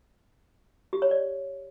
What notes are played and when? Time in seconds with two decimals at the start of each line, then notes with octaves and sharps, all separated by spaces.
0.93 G4
1.02 C#5
1.11 D5